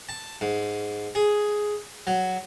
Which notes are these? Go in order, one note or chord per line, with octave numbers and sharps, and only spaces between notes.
A5
G#2
G#4
F#3